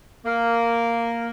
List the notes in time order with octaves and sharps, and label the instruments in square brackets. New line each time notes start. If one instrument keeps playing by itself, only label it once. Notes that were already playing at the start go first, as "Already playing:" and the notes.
[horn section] A#3